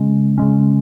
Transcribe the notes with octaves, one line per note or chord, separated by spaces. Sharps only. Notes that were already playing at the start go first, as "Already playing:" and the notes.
Already playing: C#3 G#3 C#4
C#3 G#3 C#4